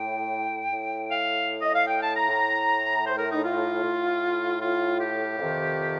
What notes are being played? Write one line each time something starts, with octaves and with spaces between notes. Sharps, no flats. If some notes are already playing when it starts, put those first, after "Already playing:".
Already playing: A2 G5
A2
F5
D#5
F5
G5
A5
A#5
A2
C5
A#4
D#4
F4
A2
F4
G4
F2 C3 D#3